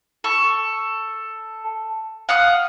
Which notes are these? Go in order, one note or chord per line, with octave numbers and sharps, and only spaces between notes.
A4 C#6
F5 F#5 D#6